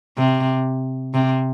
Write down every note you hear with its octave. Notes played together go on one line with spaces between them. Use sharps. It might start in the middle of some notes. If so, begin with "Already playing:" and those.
C3
C3